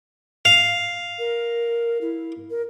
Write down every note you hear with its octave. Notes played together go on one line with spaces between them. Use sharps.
F5
A#4
E4
A#4